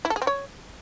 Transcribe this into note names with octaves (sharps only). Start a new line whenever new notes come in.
E4
A4
G#4
C4
C#5